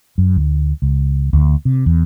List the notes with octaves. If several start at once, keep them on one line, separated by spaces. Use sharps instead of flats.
F#2
D2
C#2
D2
C3
E2